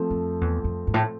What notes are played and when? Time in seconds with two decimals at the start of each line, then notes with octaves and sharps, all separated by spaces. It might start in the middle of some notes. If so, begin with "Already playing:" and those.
Already playing: F3 A3 C4
0.11 F2
0.41 E2
0.64 F2
0.87 G2
0.94 A2